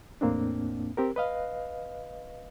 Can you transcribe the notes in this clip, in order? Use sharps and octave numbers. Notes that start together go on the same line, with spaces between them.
E2 A2 A#3 C4 D4
C4 G4 A#4
B4 D#5 F5